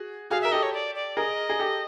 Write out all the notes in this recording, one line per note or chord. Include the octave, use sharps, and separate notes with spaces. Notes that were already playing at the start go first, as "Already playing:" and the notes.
Already playing: F#4 G#4
F#4 G#4 F5
A#4 E5
G4 A4 D#5
C#5
D5
D5
G#4 A#4 D#5
G#4
G4 A4